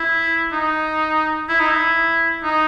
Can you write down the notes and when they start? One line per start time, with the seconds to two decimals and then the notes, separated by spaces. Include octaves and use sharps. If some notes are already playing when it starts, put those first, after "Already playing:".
Already playing: E4
0.52 D#4
1.48 E4
1.60 D#4
1.71 E4
2.44 D#4